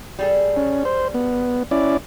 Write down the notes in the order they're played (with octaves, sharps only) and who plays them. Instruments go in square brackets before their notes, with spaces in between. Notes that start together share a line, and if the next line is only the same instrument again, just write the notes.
[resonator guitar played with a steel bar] G3 G#4 A4
[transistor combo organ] C#4
C5
B3
C#4 E4 D5